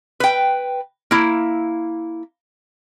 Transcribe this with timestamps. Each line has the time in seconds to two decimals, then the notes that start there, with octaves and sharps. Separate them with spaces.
0.20 B4 G5
1.11 A#3 E4